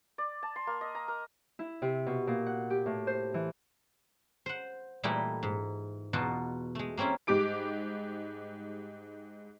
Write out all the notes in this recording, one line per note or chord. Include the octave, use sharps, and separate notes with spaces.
D5
A5
C6
A#3
D#5
A#5
A#4
E4
C3
B2
A#2
F#5
G4
A2
C5
E3
C5 F#5
A#2 E3 G3 A3 D#4 E4
G#2
E2 B2 D#4 F4 F#4 A5
G#3 A3
A#3 C4 C#4 E4 F4
G#2 G3 G4 D6 D7